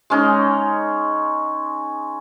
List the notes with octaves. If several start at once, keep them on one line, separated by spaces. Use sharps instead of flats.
G#3 C#4 D#4